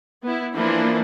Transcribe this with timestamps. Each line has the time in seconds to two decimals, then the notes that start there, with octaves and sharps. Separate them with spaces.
0.23 B3 E4
0.55 E3 F3 A#3 D4 E4